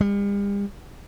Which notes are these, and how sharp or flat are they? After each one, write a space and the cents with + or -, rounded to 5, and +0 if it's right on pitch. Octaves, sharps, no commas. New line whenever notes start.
G3 +45